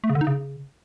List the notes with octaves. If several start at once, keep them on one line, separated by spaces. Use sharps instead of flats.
A3
C#3
D3
D#4
C#3